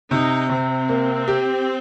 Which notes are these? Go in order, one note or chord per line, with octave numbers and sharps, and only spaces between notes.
C3 D#4
C3 C4
A#3
G4